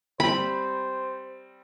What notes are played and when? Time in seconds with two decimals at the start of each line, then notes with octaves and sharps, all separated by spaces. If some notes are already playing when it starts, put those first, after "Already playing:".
0.20 G3 C4 C5 B5